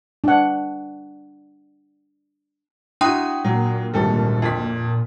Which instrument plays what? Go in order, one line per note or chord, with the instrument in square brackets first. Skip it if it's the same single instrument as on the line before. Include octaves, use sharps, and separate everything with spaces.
[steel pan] D4 F#5
[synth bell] D4 G5 D#6 [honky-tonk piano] E4 F#4 [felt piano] C6 F#6
[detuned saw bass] A#2 [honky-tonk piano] F#3
[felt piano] G#1 D2 F3 [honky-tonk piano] G3 A4
[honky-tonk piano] F2 B6